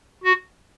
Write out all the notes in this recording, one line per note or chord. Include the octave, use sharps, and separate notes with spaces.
F#4